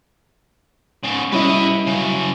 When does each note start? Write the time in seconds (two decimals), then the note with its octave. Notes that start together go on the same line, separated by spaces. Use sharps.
1.04 G#2 C#3
1.32 G3 C#4 E4 B4 D#5
1.87 C#3 F#3